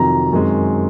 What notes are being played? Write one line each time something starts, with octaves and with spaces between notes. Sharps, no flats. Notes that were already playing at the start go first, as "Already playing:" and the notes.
Already playing: F2 C3 D#3 F#3 A#5
F#2 D#3 G#3 C4